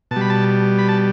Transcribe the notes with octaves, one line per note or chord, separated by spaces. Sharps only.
B2 A5
G3
B5
A5
B5
A5